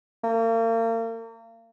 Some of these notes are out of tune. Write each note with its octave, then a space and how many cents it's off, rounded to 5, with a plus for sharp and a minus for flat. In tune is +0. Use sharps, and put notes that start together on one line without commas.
A#3 -40